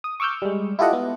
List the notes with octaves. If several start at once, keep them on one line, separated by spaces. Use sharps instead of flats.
D#6
C#6 D6 E6 F6 G6
G3 G#3
E4 F4 G4 A4 D#5 F#5
B3